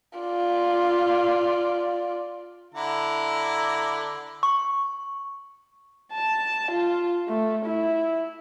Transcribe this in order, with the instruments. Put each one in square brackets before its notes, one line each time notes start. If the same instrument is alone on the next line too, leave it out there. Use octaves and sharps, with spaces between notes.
[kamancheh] F4 D5
[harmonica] D3 E4 A#5
[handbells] C#6
[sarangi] A5
F4
A3
E4